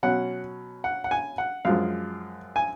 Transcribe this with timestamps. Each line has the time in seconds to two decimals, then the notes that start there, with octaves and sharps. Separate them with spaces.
0.03 B2 F#3 C#4 F#5
0.84 F#5
1.04 F#5
1.11 G#5
1.38 F#5
1.65 F#2 F3 G#3 F5
2.56 G#5